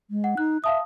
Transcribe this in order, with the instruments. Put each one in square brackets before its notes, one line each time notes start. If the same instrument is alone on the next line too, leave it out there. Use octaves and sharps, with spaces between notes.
[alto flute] G#3
[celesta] F#5
[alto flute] D#4 [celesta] F#6
[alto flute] E5 [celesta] F5 A5 D#6